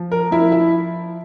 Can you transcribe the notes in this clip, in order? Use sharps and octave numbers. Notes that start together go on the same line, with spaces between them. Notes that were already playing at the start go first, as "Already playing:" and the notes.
Already playing: F3
A#4
F3 E4
E4